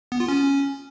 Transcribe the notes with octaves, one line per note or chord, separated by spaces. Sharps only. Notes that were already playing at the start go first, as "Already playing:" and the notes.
B3
F4
C#4